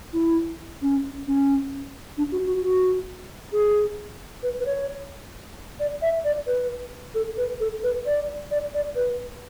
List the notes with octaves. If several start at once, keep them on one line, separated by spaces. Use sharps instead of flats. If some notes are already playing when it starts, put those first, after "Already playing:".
E4
C#4
C#4
D4
F#4
F#4
F#4
G#4
B4
B4
C#5
D5
E5
D5
B4
A4
B4
A4
B4
D5
D5
D5
B4